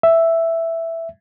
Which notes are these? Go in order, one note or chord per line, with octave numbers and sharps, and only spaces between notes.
E5